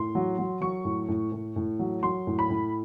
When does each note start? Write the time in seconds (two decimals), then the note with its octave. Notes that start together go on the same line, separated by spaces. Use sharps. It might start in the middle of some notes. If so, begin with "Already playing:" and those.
Already playing: A2 C6
0.15 F#3
0.38 F#3
0.61 F#3 C#6
0.85 A2
1.08 A2
1.32 A2
1.56 A2
1.79 F#3
2.03 F#3 C6
2.27 A2
2.39 B5
2.50 A2